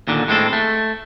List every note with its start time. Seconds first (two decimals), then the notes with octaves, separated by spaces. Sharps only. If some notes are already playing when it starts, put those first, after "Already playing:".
0.08 D#2 A#2 D3
0.28 A2 G#3 C4 A4
0.53 A3